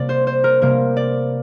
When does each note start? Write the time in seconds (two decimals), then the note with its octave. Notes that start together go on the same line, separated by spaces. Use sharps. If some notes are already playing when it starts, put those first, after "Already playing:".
Already playing: C3 G3 A#3 D5
0.09 C5
0.27 C5
0.44 A#4
0.61 C3 G3 A#3 A#4
0.97 D5